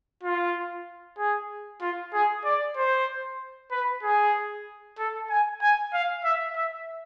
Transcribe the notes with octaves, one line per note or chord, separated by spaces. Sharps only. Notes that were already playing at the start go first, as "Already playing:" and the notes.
F4
G#4
F4
G#4
D5
C5
B4
G#4
A4
G#5
G#5
F5
E5
E5